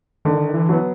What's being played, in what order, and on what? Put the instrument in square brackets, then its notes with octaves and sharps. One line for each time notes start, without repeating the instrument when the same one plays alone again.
[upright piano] D3 [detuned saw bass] D#3
[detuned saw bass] E3
[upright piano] F#3 B3